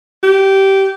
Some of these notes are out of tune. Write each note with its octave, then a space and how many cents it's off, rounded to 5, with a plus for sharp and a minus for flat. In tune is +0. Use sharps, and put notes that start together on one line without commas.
G4 -15